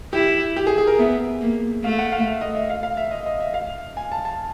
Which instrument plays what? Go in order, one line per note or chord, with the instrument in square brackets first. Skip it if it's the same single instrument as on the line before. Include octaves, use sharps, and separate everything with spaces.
[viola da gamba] E4 [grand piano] G4
[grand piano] G4
G#4
G#4
A#4
[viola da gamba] B3 [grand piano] E5
[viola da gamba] A#3
[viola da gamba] A3 [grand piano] F5
[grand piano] F#5
F5
E5
D#5
E5
F5
F5
E5
D#5
D#5
E5
F5
G#5
A5
A5